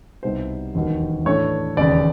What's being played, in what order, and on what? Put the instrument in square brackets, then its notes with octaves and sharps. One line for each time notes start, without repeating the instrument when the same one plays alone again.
[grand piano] C2 B2 G3 B3 D#4 C5
E1 D#2 D#3 F#3 A#3
A2 E3 A3 D4 C#5
E1 D#2 C#3 D5